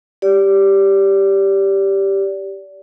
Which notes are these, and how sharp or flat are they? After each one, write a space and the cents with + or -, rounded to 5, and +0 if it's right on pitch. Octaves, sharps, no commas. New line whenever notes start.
G4 +0 D5 -25